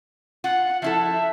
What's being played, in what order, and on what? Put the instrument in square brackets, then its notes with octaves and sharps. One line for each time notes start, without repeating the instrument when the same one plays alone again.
[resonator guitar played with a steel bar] F4 [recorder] F#5
[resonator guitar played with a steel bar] F3 E4 A4 [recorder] E5